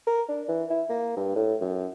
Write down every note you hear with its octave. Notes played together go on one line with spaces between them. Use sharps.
A#4
D4
E3
E4
A#3
G2
A2
F#2